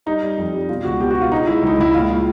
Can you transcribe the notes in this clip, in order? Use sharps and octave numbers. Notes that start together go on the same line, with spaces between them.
G3 D#4
G3
F2
G3
B2 F4
C#2 F#4
B3 G4
F#4
B2
F4
C#3 D#4
G#3 E4
C#2 D#4
C#2 E4
A#2 F4
A#2